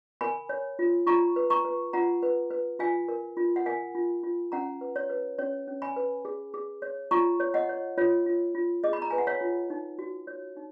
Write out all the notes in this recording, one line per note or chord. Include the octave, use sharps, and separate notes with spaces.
A#4 G#5 B5
C#5
F4
F4 A#5 C#6
B4
A#5 C#6
B4
F4 F#5 A#5
B4
B4
F4 F5 G#5
A#4
F4
F#5
A#4 F5 G#5
F4
F4
C#4 F#5 A#5
B4
C#5
B4
C#4 C#5
C#4
G#5 B5
B4
G#4
G#4
C#5
F4 A#5 C#6
C#5
D#5 F#5
C#5
F4 C#5
F4
F4
G#4 D#5
B5
A#5
B4 G#5
F#5
C#5 F5
F4
D#4
F#4
C#5
D#4